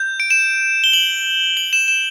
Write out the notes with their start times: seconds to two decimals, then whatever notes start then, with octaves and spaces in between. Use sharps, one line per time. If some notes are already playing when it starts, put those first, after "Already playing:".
Already playing: G6
0.20 D7
0.31 E7
0.84 G7
0.93 F#7
1.57 F#7
1.73 E7
1.88 E7